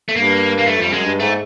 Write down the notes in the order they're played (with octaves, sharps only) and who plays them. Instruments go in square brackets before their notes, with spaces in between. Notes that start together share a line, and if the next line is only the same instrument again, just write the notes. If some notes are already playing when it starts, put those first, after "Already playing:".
[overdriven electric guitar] A3
[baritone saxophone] G2 [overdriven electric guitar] A#3
[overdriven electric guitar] A#3
A3
[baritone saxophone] F2 [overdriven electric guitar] G3
[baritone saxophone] F#2 [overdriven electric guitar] G#3
[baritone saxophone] G2
[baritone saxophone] G#2 [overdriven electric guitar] A3